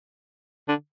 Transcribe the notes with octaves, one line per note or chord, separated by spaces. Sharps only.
D3